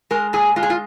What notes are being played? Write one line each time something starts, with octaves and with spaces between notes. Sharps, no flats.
G#3 A#4
A#2 G#4
G#3 F4
G#4
F4